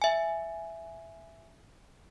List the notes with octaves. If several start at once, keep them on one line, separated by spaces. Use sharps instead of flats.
E5 G#5